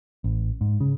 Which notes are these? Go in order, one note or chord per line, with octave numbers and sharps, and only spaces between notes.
A1
G#2
C#3